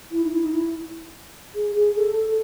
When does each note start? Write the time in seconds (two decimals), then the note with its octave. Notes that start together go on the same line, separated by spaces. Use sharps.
0.11 E4
0.24 D#4
0.32 E4
0.42 D#4
0.53 E4
1.55 G#4
1.76 G#4
1.96 A4
2.16 A4